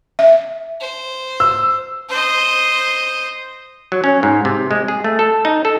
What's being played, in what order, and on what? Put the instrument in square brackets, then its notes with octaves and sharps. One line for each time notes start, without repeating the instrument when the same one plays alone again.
[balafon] E5
[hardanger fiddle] C5
[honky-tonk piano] E6
[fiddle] C5 D#5
[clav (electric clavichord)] F#3
C#4
G#2
C3
G#3
G#4
A3
A4
D#4
A4